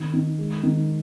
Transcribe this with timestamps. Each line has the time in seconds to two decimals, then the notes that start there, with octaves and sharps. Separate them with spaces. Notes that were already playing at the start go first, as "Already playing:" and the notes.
Already playing: D#3
0.13 D#3
0.39 G#3
0.63 D#3